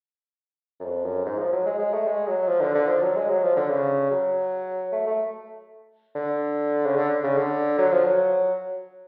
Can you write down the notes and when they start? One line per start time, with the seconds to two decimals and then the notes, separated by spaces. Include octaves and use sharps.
0.80 F#2
0.85 F2
1.05 F#2
1.25 G#2
1.39 F3
1.52 F#3
1.66 G#3
1.79 G#3
1.94 A3
2.07 G#3
2.27 F#3
2.48 F3
2.60 D3
2.75 D3
2.88 F3
3.02 F#3
3.16 G#3
3.29 F#3
3.43 F3
3.56 D3
3.71 C#3
4.11 F#3
4.92 A3
5.07 A3
6.15 D3
6.86 C#3
6.96 D3
7.23 C#3
7.37 D3
7.78 F#3
7.92 F3
8.05 F#3